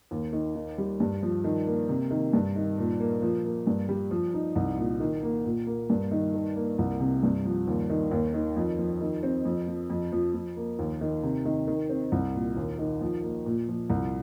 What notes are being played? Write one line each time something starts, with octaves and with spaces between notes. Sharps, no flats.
D#2
D#3
D#3
G3
G2
F3
D#3
A#3
C3
D#3
G2
D#3
A#2
A#3
F3
A#3
G2
G3
F3
D#4
C2
A#2
D#3
A#3
A#2
A#3
G2
D#3
D#3
A#3
C2
C3
G2
F3
D#2
D#3
D#2
D#3
F2
F3
D#3
C4
F2
F3
F2
F3
F3
A#3
D#2
D#3
C3
D#3
D#3
C4
C2
A#2
D#2
D#3
F3
A#3
A#2
F3
C2